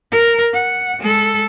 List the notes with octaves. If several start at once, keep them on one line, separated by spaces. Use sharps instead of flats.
A#4
F#5
G#3 A4